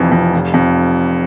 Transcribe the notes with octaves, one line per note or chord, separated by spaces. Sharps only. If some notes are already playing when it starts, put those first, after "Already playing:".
Already playing: F1 F2 E3
F2
F1
F2